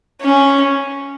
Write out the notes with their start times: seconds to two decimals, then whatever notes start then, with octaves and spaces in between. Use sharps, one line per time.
0.22 C#4